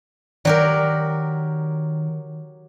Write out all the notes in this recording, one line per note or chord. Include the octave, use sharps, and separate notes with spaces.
D#3 F#3 G4 A#4 D5